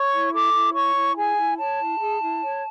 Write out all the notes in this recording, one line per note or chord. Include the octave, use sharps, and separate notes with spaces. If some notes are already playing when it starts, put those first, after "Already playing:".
Already playing: C#5 C#6
E4
A4 D6
E4
C#5 C#6
E4
G#4 G#5
E4
C#5 A5
E4
G#4
E4
C#5